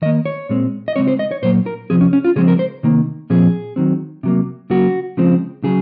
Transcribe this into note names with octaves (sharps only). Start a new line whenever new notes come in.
D#3 A#3 D#5
C#5
A#2 G#3 C4
D#5
C#3 G#3 C4 C#5
C5
D#5
C#5
A#2 F#3 A#3 C5
A#4
C3 F3 C4 G#4
C#4
C#4
F4
C#3 F3 G#3 C4 G#4
A#4
C5
C3 D#3 A#3
A#2 F3 C4 G#4
D#3 F#3 C4
C3 F#3 A#3
C#3 F#3 A#3 F#4
C#3 F3 G#3 C4
C#3 F#3 G#4